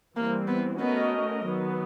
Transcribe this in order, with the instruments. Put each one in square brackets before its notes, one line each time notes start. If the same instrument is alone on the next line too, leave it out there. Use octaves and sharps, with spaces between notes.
[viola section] E3 G3 C4 [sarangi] A#3
[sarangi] B3
[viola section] A3 C#4 F#4 A#4 D#5 [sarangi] B3
[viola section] D#3 F#3 B3